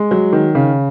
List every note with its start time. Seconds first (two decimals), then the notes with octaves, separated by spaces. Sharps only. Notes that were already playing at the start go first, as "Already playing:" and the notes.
Already playing: G#3
0.11 F#3
0.32 D#3
0.55 C#3